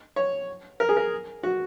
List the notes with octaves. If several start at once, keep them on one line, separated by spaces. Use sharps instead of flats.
C#5
A#4
G#4
A#4
F#4